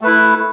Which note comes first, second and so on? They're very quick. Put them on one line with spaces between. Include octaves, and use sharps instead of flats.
A3 B4 E4